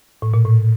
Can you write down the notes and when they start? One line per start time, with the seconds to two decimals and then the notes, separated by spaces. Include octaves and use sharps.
0.22 A2
0.34 A#2
0.45 A2